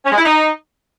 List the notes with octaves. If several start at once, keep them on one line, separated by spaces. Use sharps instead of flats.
C#4
G#3
E4
D#4